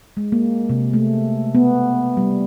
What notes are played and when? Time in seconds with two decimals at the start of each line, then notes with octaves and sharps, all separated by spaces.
0.17 G#3
0.32 A#3
0.69 C3
0.94 A3
1.55 B3
2.17 G3